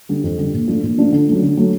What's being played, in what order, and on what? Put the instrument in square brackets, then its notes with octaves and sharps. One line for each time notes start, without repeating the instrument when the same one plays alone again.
[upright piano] D3 G3
F2
D3 G3
A#2
F3 A3 D4 F4
A#2
F3 A3 D4 F4
D3
F#3 A3
D3
F#3 A3